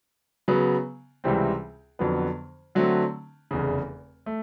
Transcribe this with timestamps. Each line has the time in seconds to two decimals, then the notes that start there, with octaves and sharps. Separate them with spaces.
0.48 C#3 F#3 B3
1.24 C#2 C3 E3 G3 C4
1.99 F2 D3 F#3 B3
2.75 D3 F#3 A3 C4
3.51 F1 E2 C#3
4.26 A3